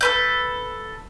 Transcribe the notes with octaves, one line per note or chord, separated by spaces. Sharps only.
A4 B4 G6